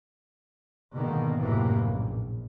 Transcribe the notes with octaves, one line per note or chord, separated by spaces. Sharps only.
G#2 B2 D3 D#3 A#3
G#1 F#2 A2 C3 E3 A#3
A#1